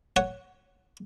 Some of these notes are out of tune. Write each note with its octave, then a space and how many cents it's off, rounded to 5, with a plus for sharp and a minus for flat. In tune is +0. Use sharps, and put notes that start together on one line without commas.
C#5 +0 F#5 +0